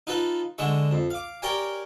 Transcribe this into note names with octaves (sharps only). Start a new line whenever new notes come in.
D#4 F4 A4 B4
D3 G#3 E5 C#6
F2
F5 D6
G4 A#4 C#5 D5 G5 G#5